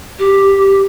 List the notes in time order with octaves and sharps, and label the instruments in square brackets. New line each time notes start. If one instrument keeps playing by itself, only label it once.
[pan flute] G4